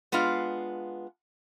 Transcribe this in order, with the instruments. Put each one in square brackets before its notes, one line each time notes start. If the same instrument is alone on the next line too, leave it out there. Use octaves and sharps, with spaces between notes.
[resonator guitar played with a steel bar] G#3 B3 D4 F4 F5